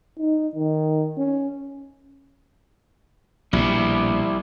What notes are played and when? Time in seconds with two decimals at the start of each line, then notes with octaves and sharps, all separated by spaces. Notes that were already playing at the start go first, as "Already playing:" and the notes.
0.18 D#4
0.56 D#3
1.18 C#4
3.53 A#1 B2 G3 E4